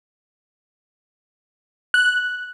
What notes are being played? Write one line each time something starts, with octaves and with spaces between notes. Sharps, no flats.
F#6